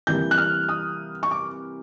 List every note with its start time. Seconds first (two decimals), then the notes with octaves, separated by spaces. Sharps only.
0.07 C3 E3 G3 A#3 G6
0.31 F#6
0.38 F6
0.69 D#6
1.23 C#6
1.31 D6